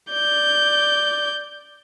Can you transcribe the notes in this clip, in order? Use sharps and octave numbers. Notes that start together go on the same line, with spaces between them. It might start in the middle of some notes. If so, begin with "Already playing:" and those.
D5 G6